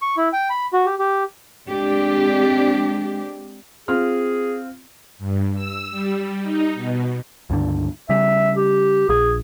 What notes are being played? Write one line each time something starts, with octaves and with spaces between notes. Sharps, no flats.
C#6
E4
G5
B5
F#4
G4
G4
G#3 C4 D4 G4
C4 F4 G#4 F6
G2
E6
G3
D#4
B2
C#2 G2 D3
C#3 G3 E5
G4
A#1 G#4